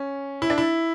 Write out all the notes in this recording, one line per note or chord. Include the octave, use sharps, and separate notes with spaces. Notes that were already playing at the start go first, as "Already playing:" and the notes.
Already playing: C#4
E4
D4
E4